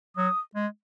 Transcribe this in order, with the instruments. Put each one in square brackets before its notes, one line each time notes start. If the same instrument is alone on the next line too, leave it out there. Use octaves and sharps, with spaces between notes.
[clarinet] F#3 [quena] D#6
[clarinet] G#3